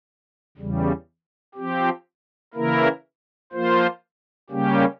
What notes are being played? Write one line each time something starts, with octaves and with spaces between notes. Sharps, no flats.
E2 C#3 G3
F3 C4 G4
C#3 E3 A#3 E4 A#4
F3 A#3 F4 C5
C#3 G3 A#3 C#4 G4